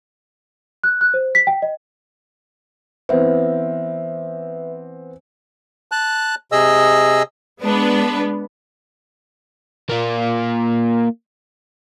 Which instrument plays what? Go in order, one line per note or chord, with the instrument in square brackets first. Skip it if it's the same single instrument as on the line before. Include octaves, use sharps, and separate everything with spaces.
[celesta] F#6
F#6
C5
B6
G5
D#5
[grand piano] E3 B3 C4 [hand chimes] B4 E5
[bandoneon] A5 F#6
C3 G#4 D#5 E6
[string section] G#3 B3 D4 B4
[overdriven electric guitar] A#3 F4